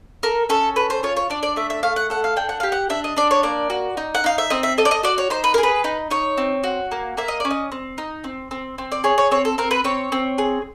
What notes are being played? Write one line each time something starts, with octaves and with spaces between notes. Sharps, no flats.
A4 A#4
C#4 A4
A4 B4
C5
F4 C#5
C#5
D4 D5
D5
A3 E5
E5
A3 F5
F#5
A4 F#5
F5
D4 G5
F#5
G4 F5
F#5
D4 E5
D#5
D4 D5
C#5
A#3 D5
F#4
D#4
F#5
D#4 F5
E5
C4 D#5
E5
A4 D#5
D5
D#5
F#4 D5
C#5
D#4 C5
B4
A#4
G#4
B4
D#4
D#4 C#5
C4
F#4
A#3
A#3 E5
D#5
C#4 D5
D#5
C4
D#4
C4
C4
C4
D5
G#4 C#5
C#5
C4 C#5
A4
C4 A#4
B4
C4 C#5
C4
G#4